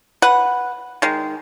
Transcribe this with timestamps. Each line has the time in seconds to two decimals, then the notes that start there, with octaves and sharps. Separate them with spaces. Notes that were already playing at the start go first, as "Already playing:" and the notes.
0.22 B4 F#5
1.02 D#3 G#3